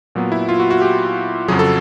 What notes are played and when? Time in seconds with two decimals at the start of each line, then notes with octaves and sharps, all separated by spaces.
0.15 A#2 F#3 B3
0.32 E4
0.49 F4
0.60 F#4
0.70 F#4
0.82 G4
1.48 F2 C#3 F#3 G#4
1.59 A4